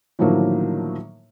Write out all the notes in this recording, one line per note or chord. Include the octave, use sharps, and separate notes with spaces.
A2 D3 D#3 F3 F#3 A#3